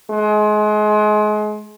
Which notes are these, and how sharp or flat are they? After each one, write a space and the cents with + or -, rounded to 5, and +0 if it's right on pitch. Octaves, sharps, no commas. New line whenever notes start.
G#3 +30